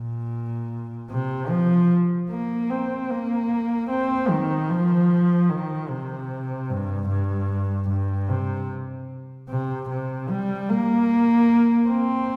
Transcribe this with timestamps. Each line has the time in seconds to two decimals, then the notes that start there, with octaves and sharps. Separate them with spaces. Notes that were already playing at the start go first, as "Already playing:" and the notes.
Already playing: A#2
1.10 C3
1.50 F3
2.30 A#3
2.70 C4
3.10 A#3
3.90 C4
4.30 D#3
4.70 F3
5.49 D#3
5.89 C3
6.69 G2
7.09 G2
7.89 G2
8.29 C3
9.49 C3
9.89 C3
10.29 G3
10.69 A#3
11.89 C4